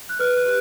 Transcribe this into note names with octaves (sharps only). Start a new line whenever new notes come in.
F#6
B4 F6
F#6
G4